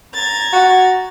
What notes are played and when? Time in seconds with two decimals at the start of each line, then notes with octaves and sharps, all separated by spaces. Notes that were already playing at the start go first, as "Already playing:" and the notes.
0.14 A#5 G#6 A6
0.53 F#4